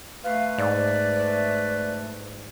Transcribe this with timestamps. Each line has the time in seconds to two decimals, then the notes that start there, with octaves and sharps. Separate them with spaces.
0.24 A3 B4 F5
0.58 G#2 D5